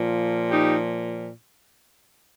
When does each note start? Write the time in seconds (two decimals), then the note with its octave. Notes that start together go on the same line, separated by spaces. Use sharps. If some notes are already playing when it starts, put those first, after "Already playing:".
Already playing: A#2 F3
0.51 D#4 G4